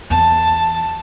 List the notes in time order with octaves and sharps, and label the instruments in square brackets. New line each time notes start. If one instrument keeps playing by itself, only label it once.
[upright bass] E2 [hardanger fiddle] A5